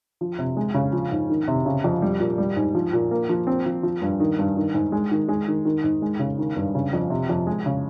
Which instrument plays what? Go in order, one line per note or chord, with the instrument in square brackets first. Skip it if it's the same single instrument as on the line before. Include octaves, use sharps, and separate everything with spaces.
[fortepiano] F3
C3
G#3
C#3
F3
G#2
D#3
C3
C#3
F2
G3
A#2
G3
G#2
F3
A#2
A#3
F3
C4
F3
F3
G2
D#3
G2
D#3
G#2
G#3
D#3
G#3
D#3
D#3
G#2
G#3
C#3
D#3
G2
C#3
F2
C3
F2
G#3
C#3